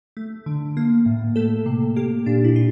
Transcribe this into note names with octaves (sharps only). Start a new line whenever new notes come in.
A3
D3
A#3
A2
A3 A4
C3
A#3 G4
A#2 D4
E4
F4